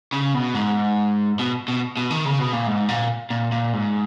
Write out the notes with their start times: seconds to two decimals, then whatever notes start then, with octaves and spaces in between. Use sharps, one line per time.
0.13 C#3
0.34 B2
0.55 G#2
1.39 B2
1.68 B2
1.97 B2
2.10 D#3
2.25 C#3
2.39 B2
2.53 A#2
2.67 G#2
2.89 A#2
3.30 A#2
3.52 A#2
3.73 G#2